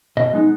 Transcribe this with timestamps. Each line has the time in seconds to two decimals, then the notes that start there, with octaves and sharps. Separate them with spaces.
0.17 B2 D#5
0.33 G#3 B3 D#4